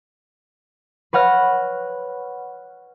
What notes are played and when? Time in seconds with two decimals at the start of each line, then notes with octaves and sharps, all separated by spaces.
1.13 B4 C#5 F#5 F6 A#6